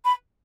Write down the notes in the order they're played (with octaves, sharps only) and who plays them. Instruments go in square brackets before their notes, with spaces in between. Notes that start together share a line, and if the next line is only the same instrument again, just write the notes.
[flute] B5